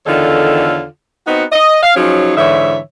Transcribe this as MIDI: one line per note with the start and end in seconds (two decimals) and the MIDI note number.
0.06 0.84 40
0.06 0.84 50
0.06 0.84 51
0.06 0.84 65
0.06 0.84 69
0.06 0.84 73
1.27 1.44 59
1.27 1.44 60
1.27 1.44 63
1.27 1.44 66
1.52 1.79 75
1.83 1.91 77
1.96 2.36 53
1.96 2.36 54
1.96 2.36 61
1.96 2.36 63
1.96 2.36 68
1.96 2.36 73
2.37 2.78 44
2.37 2.78 50
2.37 2.78 52
2.37 2.78 73
2.37 2.78 76